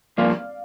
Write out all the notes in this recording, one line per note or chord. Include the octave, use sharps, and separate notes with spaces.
G2 F3 A#3 D5 F5